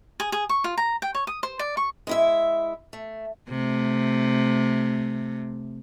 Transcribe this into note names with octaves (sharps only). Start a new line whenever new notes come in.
G#4
G#4
C#6
F4
A#5
G5
C#5
D#6
C5
D5
C#6
G#3 E4 E5
A3
C3 A3